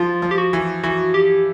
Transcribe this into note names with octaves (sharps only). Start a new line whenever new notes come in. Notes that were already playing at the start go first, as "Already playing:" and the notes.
Already playing: F3 F4
F3
G4
F#4
E3
E3 F#4
G4